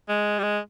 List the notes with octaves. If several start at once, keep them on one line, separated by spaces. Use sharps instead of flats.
G#3
G3
G#3